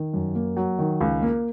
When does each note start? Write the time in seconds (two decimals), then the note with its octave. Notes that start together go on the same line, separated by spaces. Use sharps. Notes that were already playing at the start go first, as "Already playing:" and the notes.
Already playing: D#3
0.13 F#2
0.35 A#3
0.57 F#3
0.79 D#3
1.01 C#2
1.22 A#3